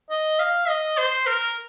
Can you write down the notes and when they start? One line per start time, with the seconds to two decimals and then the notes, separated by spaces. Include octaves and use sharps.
0.10 D#5
0.39 F5
0.68 D#5
0.98 C5
1.26 A#4